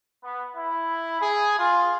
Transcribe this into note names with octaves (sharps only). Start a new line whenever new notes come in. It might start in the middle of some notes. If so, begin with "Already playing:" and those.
B3
E4
G#4
F4